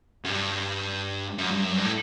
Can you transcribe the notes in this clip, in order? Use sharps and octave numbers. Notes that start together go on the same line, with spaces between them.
F#2
G2
F#2
G2
F#2
G2
A2